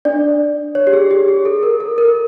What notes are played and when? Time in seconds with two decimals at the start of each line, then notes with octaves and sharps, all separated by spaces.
0.05 D4 D5
0.75 C#5
0.87 G4
0.93 G#4
1.11 G4
1.28 G#4
1.45 A4
1.63 A#4
1.80 A4
1.98 A#4